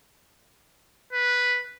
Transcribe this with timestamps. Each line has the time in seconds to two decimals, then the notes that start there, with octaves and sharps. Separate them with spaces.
1.13 B4